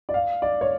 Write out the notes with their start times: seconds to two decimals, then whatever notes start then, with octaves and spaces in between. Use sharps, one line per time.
0.09 D5
0.14 F5
0.42 D5
0.61 C#5